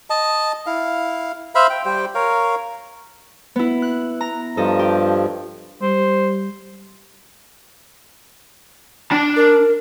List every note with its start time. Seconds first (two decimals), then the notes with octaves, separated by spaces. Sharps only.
0.10 D#5 A5
0.66 E4 F5
1.55 C5 E5 F5 B5
1.70 G5
1.85 G3 G4 C5 G5
2.15 A#4 C#5 F5
3.56 B3 E4
3.82 F#6
4.21 A#5
4.57 G2 F3 A4 D#5
4.79 G4
5.82 G3 C5
9.11 D4 A5
9.36 A#4